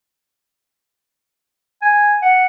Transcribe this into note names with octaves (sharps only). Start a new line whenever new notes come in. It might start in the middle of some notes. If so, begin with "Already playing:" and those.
G#5
F#5